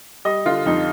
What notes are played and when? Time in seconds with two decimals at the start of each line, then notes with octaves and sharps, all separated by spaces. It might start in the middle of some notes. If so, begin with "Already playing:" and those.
0.25 G3 D#5
0.45 D3 F4
0.66 F2 D#4